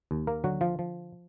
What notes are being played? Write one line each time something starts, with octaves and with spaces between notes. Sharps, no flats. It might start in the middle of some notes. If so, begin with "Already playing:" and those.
D#2
A#3 A#4
D3 F#3 F#4
F3 F4
F3